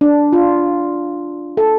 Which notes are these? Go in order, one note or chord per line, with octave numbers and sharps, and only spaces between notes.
D4
F4
A4